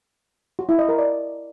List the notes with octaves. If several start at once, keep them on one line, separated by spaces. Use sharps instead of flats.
F#4
E4
D#5
A#4
D5